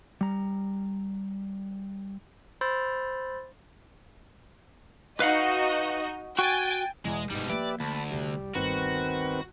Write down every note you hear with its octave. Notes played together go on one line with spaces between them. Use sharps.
G3 A#5
C5 B5 C6 E6 G6 A6
D#4 F#4 B4 D#5 F5 F#5
F#4 G5 G#5 A6
E2 B2 G#3
G1 G#2 B2 G3 D#4
F3 A#3 G4 B4 D5 E5
D2 A5 B5
C2 F2 G3
G1 D#2 D#3 C4 F#4 B4